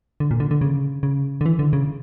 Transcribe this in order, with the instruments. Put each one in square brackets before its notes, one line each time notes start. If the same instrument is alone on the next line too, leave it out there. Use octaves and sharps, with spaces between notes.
[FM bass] D3
A#2
D3
D3
C#3
C#3
D3
E3
D3
C#3